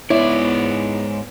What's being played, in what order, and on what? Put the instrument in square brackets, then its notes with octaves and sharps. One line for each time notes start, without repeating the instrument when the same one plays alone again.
[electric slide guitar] G#2 D5 [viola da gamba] B3 [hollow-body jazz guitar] E4 [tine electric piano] C#5